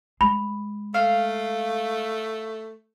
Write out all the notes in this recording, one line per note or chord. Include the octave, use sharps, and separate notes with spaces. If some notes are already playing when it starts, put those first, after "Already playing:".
G#3 B5
A3 F5